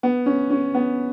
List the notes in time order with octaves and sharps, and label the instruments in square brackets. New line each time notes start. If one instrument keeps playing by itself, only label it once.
[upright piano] B3
C#4
C#4
B3